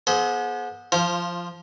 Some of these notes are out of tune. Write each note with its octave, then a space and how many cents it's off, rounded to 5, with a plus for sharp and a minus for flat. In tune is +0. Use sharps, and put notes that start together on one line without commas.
B3 -30 G#4 +35 C5 -5
F3 +0 F4 -20 C5 +15